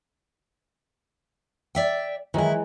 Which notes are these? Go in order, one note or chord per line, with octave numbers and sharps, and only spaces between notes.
D5 E5 G5
D#3 E3 F#3 G#3 E4